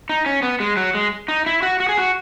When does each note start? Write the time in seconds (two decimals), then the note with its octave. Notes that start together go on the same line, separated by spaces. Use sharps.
0.09 D#4
0.26 C#4
0.42 B3
0.60 G#3
0.77 F#3
0.95 G#3
1.28 D#4
1.46 E4
1.63 F#4
1.80 F#4
1.89 G#4
1.97 F#4